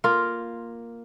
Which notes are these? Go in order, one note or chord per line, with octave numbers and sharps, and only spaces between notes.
A#3 F4 A#4